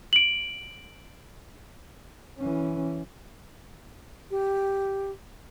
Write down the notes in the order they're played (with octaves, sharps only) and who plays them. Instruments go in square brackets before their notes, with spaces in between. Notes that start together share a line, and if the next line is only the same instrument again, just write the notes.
[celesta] D7 F#7
[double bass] E3 C#4
[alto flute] G4